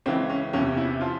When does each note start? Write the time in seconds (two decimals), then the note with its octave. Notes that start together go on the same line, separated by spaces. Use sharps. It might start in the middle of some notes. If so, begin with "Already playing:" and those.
0.06 C#2 C#3 E3 C4
0.29 C#4
0.53 E2 C3 E3 C#4
0.77 E4
1.01 F3 F4